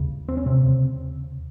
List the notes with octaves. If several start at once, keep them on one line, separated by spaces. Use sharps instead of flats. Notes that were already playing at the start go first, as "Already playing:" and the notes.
Already playing: D#2 C#3
C4
C#4
C3 C4
D#2 C#3